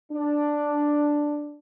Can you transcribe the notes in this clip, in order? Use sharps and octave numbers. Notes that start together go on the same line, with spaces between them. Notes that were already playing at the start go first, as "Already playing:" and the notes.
D4